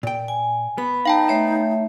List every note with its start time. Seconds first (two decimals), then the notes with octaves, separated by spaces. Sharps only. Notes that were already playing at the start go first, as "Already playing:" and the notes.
0.03 A#2 G5
0.28 G#5
0.78 B3 B5
1.06 D#4 F5 G5 A5
1.28 A3 C#5 E5